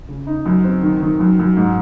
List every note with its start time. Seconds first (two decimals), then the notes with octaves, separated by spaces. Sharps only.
0.08 C#3
0.27 D#4
0.46 F#2
0.64 C4
0.83 D#3
1.02 D#3
1.20 F#2
1.39 F#2
1.57 G#2